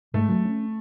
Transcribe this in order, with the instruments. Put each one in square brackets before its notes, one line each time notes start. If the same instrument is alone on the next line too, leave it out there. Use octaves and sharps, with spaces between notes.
[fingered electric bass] G#2 [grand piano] A3
[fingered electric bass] F#3
C#4